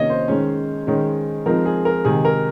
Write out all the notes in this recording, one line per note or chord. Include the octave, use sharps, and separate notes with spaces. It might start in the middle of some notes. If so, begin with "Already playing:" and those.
Already playing: C3 D#3 A#3 C#4 C#5 D#5
C5
D#3 G#3 C#4
D#3 G#3 C#4
F3 G#3 C4 D#4 A#4
G#4
A#4
C3 D#3 G#3 G#4
A#4